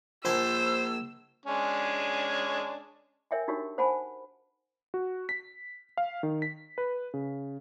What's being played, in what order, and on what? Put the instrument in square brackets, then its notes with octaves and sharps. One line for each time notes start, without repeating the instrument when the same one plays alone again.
[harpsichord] A#1 G#5 A5 [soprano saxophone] C5 [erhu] E6
[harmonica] G#3 C#4 D4
[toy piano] A#4 C#5 E5 G5 G#5
D4 D#4 F#4 G4 A#4 C#5
C5 F#5 G#5 A5 B5
[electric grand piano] F#4
B6
F5
D#3
B6
B4
C#3